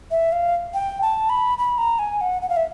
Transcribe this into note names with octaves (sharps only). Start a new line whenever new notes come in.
E5
F5
G5
A5
B5
B5
A#5
G#5
F#5
F#5
F5
E5